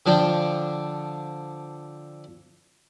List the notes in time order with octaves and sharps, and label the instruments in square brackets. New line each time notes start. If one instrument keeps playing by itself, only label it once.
[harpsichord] D3 F3 D4 G5